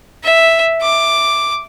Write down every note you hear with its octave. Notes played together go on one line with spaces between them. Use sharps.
E5
D6